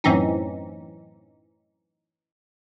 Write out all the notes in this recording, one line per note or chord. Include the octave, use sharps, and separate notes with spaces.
F#2 A2 E3 C4 C#4 D#4